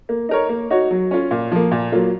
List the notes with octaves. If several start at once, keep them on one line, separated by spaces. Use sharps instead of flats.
A#3
D#4 A#4 C#5
A#3
D#4 F#4 C#5
F#3
C#4 F4
A#2
F3 A#3
A#2
F#3 A#3 F4